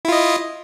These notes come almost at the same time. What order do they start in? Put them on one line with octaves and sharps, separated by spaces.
E4 F4 D#5